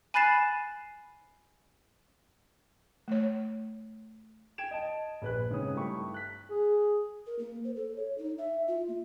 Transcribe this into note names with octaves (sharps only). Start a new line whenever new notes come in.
G#5 B5 F#6 A6 C7 E7
A3 C#5
G5 G#6 D7 E7
D#5 A5
A#1 B4 F#6
G#2 C#3 C4 C#4 C#5 D#6
G2 A3 E4 G4 B5 C#6
F#6 B6
G#4
A#4
A#3
C5
A4
C#5
D#4
E5
F4
A#3